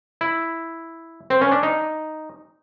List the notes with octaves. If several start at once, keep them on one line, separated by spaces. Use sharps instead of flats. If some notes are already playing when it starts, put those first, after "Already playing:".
E4
C4
C#4
D4
D#4